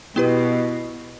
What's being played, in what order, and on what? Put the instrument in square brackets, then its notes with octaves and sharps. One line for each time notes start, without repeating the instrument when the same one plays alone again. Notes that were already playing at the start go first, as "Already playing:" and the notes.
[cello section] B2 [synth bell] B3 E4 G4 B4